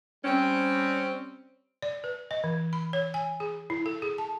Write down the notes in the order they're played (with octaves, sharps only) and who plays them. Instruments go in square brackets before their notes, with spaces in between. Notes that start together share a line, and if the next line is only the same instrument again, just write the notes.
[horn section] G3 C4 C#4
[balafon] D5
B4
D#5
E3
B5
C#5
G#5
G#4
E4
A4
G#4
A5